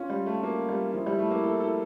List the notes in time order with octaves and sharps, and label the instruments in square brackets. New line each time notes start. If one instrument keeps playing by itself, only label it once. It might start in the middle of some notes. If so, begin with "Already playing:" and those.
Already playing: [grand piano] C#4 [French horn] F4
[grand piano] G3
A3
[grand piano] A#3 [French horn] F4
[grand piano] G3
[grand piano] F3 [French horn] E4
[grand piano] G3
A3
A#3
A4
A4